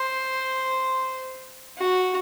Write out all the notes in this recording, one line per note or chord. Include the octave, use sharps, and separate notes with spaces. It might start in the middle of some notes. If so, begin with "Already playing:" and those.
Already playing: C5
F#4